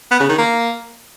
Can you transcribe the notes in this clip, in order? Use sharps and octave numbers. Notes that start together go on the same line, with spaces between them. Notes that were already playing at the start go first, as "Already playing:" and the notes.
B3
C#3
D#3
A#3